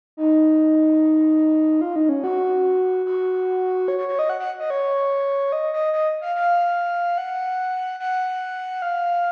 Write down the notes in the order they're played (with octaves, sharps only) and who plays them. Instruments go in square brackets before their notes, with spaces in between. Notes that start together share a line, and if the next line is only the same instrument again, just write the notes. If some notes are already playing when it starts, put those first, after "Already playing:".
[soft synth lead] D#4
F4
D#4
C#4
F#4
F#4
C#5
C#5
C#5
D#5
F#5
F#5
D#5
C#5
D#5
D#5
D#5
F5
F5
F#5
F#5
F5